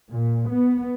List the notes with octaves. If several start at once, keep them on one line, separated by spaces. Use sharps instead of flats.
A#2
B3